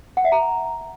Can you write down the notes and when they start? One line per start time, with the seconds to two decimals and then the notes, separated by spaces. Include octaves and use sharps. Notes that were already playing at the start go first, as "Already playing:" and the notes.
0.17 F#5
0.24 E5
0.32 A#5